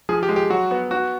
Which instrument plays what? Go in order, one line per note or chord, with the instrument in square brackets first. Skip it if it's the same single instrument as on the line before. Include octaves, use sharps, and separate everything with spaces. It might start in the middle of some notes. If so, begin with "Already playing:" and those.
[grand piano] F3 [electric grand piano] G#4
[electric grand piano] G4
[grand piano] G#3
[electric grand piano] G4
[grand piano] F#3 [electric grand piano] F#4
[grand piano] B3
F#4